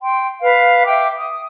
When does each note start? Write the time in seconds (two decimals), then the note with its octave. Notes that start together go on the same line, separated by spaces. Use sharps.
0.02 G5 C6
0.41 B4 F5
0.86 E5 G5 D6
1.17 D#6